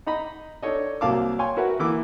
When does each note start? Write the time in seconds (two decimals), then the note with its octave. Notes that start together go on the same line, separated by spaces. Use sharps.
0.07 D#4 D#5 A#5 B5
0.62 D4 D#4 A4 C#5 D#5
1.01 C2 F#3 A#3 F5 A5 D6
1.39 C#5 F5 G5 G#5 C6 C#6
1.57 F#4 A#4 B4 E5 F#5
1.79 E3 A#3 E4 D6